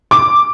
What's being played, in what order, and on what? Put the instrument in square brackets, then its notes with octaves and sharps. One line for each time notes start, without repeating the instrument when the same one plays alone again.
[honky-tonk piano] D6